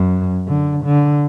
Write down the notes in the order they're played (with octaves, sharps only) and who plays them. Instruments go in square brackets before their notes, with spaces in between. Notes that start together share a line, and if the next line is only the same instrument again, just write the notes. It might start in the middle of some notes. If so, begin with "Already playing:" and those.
Already playing: [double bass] F#2
D3
D3